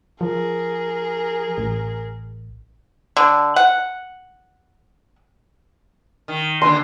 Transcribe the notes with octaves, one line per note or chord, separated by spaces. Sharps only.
F3 G#4 A#4
A1
D3
F#5
D#3
D#2 A#2 D3 C6